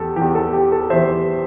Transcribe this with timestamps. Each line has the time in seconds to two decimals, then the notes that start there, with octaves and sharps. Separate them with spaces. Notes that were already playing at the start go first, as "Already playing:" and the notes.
Already playing: E2 G4 A4
0.16 E2 E3 G4
0.35 A4
0.53 G4
0.72 A4
0.90 E2 E3 C5 E5